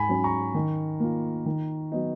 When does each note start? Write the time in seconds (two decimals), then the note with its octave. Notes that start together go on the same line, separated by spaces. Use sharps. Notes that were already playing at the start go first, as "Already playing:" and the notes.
Already playing: G#2 G#5 B5
0.09 F#3 C#4
0.24 A#5 C#6
0.54 D#3
1.00 A#3 F4
1.46 D#3
1.92 F#3 B3 D#4